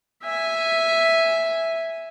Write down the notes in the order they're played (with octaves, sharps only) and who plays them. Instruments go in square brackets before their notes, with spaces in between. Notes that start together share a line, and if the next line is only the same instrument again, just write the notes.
[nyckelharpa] E5 G#5